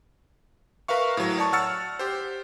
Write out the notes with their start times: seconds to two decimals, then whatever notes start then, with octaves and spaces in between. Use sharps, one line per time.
0.88 A#4 B4 E5 F5 C#6
1.17 A2 F#3
1.38 C#5 D5 A5 C#6
1.53 F#5 E6 F6 A6 C#7
1.99 G4 C5